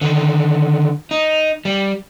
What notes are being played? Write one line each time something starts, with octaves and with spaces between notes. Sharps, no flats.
D3 D#3
D#4
G3